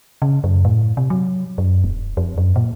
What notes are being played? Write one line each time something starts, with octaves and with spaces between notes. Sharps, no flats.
C#3
F#2
A2
C3
F#3
F#2
D#1
F2
F#2
A#2